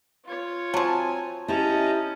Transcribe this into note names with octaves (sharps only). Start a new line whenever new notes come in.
F4 C#5
F3 F#3 C4 G#5 A5
C#4 E4 G4 D#5 A5 A#5